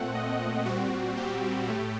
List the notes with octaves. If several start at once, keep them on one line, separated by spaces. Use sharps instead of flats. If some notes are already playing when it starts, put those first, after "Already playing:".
Already playing: A#2 A3 C4 F#5
D#5
A#2 G3 C4 F#4
G4
A2 A3